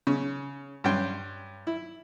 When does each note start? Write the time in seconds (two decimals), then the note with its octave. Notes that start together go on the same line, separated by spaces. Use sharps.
0.07 C#3
0.84 G2 C#4 G5 C6
1.67 E4